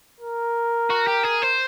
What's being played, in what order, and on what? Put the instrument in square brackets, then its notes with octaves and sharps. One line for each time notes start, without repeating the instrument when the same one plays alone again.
[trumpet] A#4
[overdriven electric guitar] F#4
G4
G#4
C5